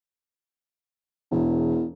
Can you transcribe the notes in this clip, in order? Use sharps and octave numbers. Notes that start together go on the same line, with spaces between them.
E1 E2